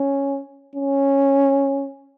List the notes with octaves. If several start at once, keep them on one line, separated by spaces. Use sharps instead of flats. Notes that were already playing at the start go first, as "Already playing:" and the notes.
Already playing: C#4
C#4